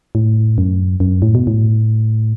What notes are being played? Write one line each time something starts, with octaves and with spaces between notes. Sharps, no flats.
A2
F#2
F#2
A2
B2
A2